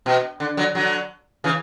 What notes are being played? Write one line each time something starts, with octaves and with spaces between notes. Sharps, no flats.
B2
D3
D3 F#3
D3 F#3
C#3 E3